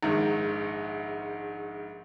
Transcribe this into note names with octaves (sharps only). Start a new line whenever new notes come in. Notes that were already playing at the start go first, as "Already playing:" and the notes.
A#1 G#2 D#3